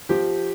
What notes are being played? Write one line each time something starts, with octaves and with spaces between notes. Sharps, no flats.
F3 G4